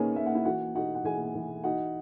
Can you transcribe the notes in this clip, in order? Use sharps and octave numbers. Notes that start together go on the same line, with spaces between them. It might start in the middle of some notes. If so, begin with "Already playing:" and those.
Already playing: D#3 A#3 C#4 G#4 B4 C#5 G#5
A#3 E5
F#5
E4 E5
E3 F#4 F#5
D#4 F#4 F#5
F#5
E3 G#4 G#5
E3
D#4 F#4 F#5